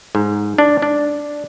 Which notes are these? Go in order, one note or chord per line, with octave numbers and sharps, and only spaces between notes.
G#2
D4
D4